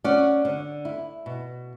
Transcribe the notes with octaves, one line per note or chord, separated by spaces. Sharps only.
C#4 D5 F#5
D3
E4
B2